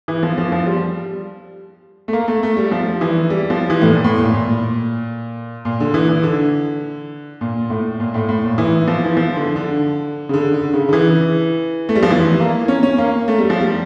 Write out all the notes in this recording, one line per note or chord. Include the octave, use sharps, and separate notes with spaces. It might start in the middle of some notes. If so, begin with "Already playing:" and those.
E3
F3
F3
F3
G3
A3
A#3
A3
A3
G3
F3
E3
G3
F3
E3
A2
A#2
A2
A#2
A#2
A#2
D3
E3
E3
D3
A#2
A2
A#2
A2
A2
A#2
E3
F3
E3
F3
D3
D3
C#3
D3
D3
C#3
D3
E3
A3
G3
F3
E3
A#3
C#4
C#4
A#3
A3
G3
F3
G3